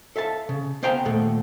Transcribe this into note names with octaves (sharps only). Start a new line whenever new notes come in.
A4 E5 F5 A5
C#3
B3 C5 F5 G5 G#5 A#5
D#2 A#2 A3 A4 F#5